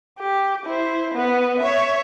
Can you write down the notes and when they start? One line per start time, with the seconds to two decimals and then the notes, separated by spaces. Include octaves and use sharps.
0.19 G4
0.65 E4 C5
1.14 B3 B4
1.60 C#5 E5